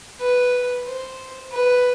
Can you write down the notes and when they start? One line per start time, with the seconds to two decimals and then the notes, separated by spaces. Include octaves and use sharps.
0.20 B4
0.86 C5
1.52 B4